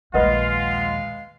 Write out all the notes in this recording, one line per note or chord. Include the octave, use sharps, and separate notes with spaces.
A#1 D#2 G#3 F4 B4 D#5 F5 F#5